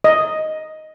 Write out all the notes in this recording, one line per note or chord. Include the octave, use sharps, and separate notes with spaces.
D#5